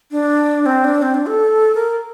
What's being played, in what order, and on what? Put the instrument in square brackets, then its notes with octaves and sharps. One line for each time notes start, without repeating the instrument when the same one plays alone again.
[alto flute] D4
C4
D4
C4
D4
A4
A#4